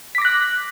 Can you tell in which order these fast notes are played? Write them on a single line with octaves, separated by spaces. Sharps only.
B6 D6 A#6 F#6